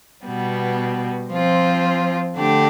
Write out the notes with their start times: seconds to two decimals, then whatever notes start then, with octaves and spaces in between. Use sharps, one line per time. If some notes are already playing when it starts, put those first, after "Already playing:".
0.25 B2 G3 B3
1.30 F3 C4 F4
2.37 D3 A3 D4 G4